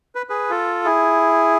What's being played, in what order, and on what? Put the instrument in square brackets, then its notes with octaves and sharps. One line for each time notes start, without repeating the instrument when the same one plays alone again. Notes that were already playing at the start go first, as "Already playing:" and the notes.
[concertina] B4
G#4 B4
F4 A4
E4 G#4